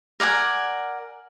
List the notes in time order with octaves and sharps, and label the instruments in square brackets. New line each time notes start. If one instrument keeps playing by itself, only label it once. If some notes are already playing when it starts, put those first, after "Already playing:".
[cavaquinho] A#4 D5 F#5 G#5